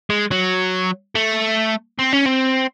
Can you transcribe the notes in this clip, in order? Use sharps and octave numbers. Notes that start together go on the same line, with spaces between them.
G#3
F#3
A3
C4
C#4
C4